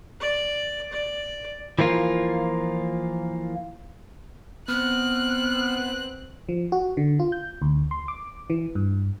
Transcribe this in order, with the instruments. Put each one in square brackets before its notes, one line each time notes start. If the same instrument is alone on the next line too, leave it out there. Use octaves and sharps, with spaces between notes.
[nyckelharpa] D5
D5
[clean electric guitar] E3 F3 A#3 F4
[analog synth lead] B3 [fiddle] C4 F#6 [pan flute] F6
[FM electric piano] F3
F#4
D3
F4
G6
D2
C6
D6
E3
G2